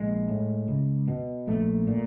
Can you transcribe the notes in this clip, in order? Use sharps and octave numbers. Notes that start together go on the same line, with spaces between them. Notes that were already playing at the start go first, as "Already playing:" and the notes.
Already playing: A#1 G#3
A2
C#2
B2
A#1 A3
A#2